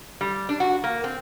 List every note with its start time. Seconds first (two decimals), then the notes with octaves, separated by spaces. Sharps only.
0.21 G3
0.49 D4
0.60 F#4
0.84 A#3
1.04 C4